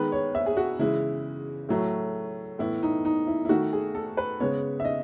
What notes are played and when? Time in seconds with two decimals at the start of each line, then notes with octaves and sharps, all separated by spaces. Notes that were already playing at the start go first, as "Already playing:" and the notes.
Already playing: D#3 G#3 B3 B4
0.12 C#5
0.35 E5
0.46 G#4
0.57 F#4
0.79 C#3 E3 G#3 E4
1.69 A2 F#3 A3
2.59 A2 E3 B3 E4
2.83 D#4
3.05 D#4
3.27 E4
3.45 E4
3.49 D#3 A3 F#4
3.73 G#4
3.95 A4
4.17 B4
4.40 C#3 G#3 B3 C#5
4.80 E5
4.85 D#5